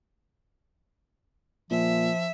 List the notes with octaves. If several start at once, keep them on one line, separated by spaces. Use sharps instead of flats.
A#2 F3 E5